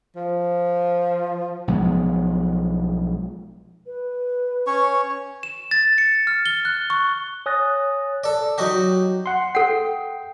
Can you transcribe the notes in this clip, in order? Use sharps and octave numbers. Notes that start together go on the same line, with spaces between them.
F3
B1 F3 G#3 B3
B4
C#4 C#5 C#6
E7
A6
C#7
F6
G7
F#6
C#6
C#5 G#5 D#6 F#6 A6 A#6
A4 D5
F#3 D#4 F#4 G4
F#5 C6
A4 F#5 G5